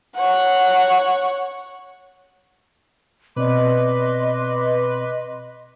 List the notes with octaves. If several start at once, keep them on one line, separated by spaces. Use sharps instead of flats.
C#5 F#5
B2 C4 B4 D5 D#5 C6 D6